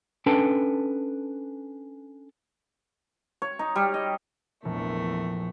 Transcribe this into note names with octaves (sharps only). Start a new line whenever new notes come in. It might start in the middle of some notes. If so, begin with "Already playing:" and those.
C#4 D4 A4 B4 G5 A5
C#5
D#4
G3
D#5
A#1 E2 A3